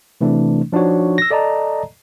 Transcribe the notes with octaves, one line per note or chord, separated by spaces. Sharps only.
C3 E3 A3 C4 D4
F3 D4 D#4 F#4 C#5
E6 A#6
A4 D5 D#5 A5 A#5